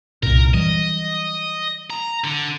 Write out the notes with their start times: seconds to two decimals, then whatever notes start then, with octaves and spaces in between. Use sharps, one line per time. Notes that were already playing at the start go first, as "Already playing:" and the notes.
0.23 C2 F#2 A#2 A#4
0.54 E3 F#3 G3 D#5
1.90 A#5
2.24 D3